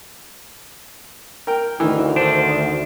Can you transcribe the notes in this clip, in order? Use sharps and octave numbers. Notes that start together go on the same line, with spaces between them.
A#4 G5
D2 D#3 E3
D#3 D4 C5